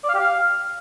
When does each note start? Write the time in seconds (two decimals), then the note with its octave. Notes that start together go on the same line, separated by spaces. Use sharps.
0.04 D5
0.09 F5
0.14 G4
0.19 F5